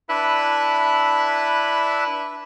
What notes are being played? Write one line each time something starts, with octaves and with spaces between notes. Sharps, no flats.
D4 E4 B4 E5 F#6